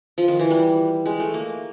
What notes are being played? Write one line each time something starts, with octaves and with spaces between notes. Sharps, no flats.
F3
D#3
E3
G3
G#3
A3
A#3